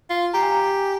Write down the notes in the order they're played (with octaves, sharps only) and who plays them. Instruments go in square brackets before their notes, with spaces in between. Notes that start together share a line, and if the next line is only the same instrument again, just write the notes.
[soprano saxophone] F4
[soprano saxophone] G4 [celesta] A#5
[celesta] G#5
A#5